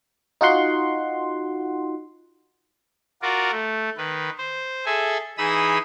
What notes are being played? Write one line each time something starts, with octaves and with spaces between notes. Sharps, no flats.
D#4 F4 F#4 F#5 C6
F4 F#4 A#4 D5
A3
D#3 B4
C5
G#4 A4 E5 G#5
E3 D#4 G#4 B5 D#6 E6